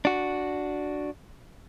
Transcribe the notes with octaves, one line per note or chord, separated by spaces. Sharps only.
D4 F#4